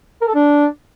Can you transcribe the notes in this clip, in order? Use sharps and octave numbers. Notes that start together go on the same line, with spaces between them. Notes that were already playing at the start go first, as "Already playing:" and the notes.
A#4
A4
D4